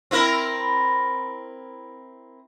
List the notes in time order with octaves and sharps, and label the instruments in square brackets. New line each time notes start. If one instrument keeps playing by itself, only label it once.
[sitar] C4 E4 A#4